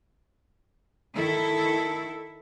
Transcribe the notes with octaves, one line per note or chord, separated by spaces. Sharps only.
D#3 E4 A4